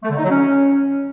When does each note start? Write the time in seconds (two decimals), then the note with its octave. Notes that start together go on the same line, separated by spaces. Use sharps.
0.03 A3
0.10 D3
0.17 D#4
0.24 F#3
0.31 C#4